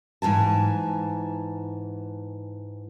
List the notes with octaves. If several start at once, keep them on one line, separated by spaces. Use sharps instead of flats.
G#2 E3 G#5 A5